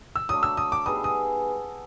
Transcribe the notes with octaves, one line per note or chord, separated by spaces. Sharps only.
E6
F#3 A3 D4 D#6
E6
D#6
D6
G3 B3 D#4 G#4 D#6
D#6